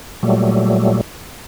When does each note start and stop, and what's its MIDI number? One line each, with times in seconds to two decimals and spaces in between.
0.23 1.01 46
0.23 1.01 54
0.23 1.01 55
0.23 1.01 57